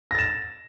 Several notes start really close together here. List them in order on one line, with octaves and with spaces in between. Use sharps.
A#6 A6 E7